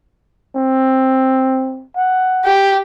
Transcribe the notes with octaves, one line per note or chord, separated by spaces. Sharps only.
C4
F#5
G4